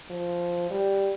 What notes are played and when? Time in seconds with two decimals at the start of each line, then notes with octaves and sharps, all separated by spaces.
0.10 F3
0.71 G3